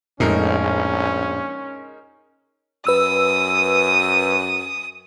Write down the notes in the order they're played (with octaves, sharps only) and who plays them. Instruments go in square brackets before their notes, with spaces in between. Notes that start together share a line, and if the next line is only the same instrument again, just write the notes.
[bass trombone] A#1 [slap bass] F2 A2 [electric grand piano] G#3 D#4 A#4 [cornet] C#4
[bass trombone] F#2 [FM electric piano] B4 E6 [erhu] D#6